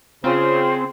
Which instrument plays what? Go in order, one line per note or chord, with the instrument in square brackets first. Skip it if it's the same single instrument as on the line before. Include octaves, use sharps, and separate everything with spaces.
[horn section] C#3 [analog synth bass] C4 [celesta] F4 F5 F6 [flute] C5